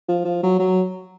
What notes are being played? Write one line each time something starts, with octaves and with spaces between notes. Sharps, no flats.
F3
F3
F#3
F#3